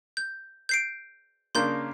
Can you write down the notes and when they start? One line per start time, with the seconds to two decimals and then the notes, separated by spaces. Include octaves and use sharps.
0.17 G6
0.69 G6 C7 D7
1.55 C#3 A#3 D4 C6 G6